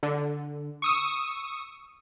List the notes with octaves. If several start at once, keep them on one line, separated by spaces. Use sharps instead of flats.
D3
C#6 D#6 E6